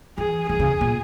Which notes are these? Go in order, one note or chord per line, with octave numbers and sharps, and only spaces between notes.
E3 G#4
D#3 G#4
C#3
A#2